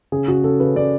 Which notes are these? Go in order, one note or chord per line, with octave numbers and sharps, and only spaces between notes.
C#3 G#4
C#3 F#4
C#3 A4
C#3 B4
C#3 D5